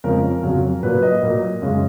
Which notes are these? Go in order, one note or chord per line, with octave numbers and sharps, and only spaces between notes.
F2 C#3 F3 G#3 A#4
F2 C#3 F#3
A#2 F#3 A#3 B4
D#5
A#2 F#3 A#3
F#2 C#3 G#3